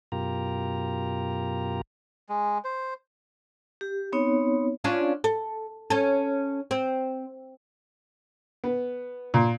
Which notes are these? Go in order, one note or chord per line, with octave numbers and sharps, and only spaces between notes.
F#2 B2 F4 G4 A#4 A#5
G#3
C5
G4
B3 C4 D#4 C#5
C#4 D4 F4
A4
C#4 A4
C4
B3
A#2